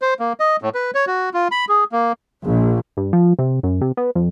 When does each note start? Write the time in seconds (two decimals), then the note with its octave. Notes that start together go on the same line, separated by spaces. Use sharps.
0.02 C5
0.19 A#3
0.40 D#5
0.62 A2
0.74 B4
0.95 C#5
1.07 F#4
1.34 F4
1.51 B5
1.69 G#4
1.92 A#3
2.44 A#1
2.97 G2
3.13 F3
3.39 C3
3.63 F#2
3.81 C3
3.97 B3
4.15 F2